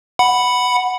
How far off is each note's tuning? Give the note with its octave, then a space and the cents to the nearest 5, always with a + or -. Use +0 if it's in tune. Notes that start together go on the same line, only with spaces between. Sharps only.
F#5 +0 B5 +0